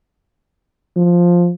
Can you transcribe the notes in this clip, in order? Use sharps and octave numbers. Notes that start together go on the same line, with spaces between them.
F3